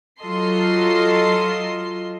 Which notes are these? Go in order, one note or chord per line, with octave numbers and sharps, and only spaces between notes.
F#3 F4 A4 D#5 C6 C7